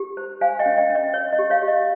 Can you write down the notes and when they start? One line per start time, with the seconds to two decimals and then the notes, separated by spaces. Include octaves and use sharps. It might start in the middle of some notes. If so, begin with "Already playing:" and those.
Already playing: G4
0.17 C5
0.41 C5 F5 G#5
0.59 D#5 G5
0.66 C#4
0.78 D#5 G5
0.90 C#4
0.95 D#5
1.14 C#5
1.33 D#5
1.39 G4
1.50 C#5 F5
1.62 G4
1.68 D#5